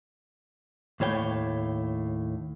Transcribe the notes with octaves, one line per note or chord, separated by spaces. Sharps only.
D#2 A2 C#5 G5